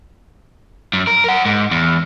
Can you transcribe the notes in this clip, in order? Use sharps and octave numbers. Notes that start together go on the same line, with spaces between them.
F#2
A#4
A#4 F#5
G#2
E2